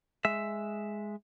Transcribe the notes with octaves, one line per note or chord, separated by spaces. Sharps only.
G#3 E5